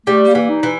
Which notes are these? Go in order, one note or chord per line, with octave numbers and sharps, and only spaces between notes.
G3 A3
A#3
E3
D#4
E3